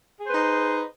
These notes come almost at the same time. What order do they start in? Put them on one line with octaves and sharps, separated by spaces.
G#4 C5 B4 D#4